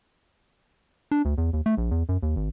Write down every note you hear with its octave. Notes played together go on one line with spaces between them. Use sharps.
D4
D2
E2
D#2
A3
A#1
E2
F#2
D#2
G#1